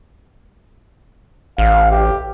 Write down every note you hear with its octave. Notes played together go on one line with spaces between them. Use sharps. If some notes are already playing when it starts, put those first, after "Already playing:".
A1 F5
G4